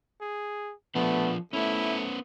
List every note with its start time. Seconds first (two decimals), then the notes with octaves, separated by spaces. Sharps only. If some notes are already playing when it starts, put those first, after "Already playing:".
0.21 G#4
0.95 F3 A3 B3 D4
1.53 A3 B3 C#4 E4